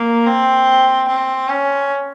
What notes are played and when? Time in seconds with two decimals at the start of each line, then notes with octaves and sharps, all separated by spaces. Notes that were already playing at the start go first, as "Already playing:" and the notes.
Already playing: A#3
0.27 C4
1.08 C4
1.48 C#4